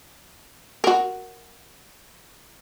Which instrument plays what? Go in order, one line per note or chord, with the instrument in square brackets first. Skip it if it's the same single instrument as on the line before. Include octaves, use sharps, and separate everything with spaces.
[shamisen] F#4 A#4